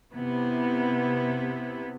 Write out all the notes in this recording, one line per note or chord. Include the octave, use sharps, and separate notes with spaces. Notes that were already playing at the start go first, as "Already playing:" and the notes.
C3 B3 E4